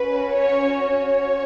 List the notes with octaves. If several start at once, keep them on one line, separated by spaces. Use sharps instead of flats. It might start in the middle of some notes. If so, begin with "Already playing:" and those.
Already playing: C#4 F#4 B4
C#5
C#5